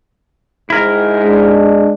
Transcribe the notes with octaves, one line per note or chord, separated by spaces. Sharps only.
G#2 E4 A#4
G#3 D4